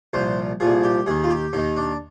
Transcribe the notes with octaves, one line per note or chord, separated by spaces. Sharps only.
C2 A#2 F3 C5
C2 A#2 F3 G#4
G4
D#2 D#3 G#4
F4
G4
D#2 D#3 D#4
D4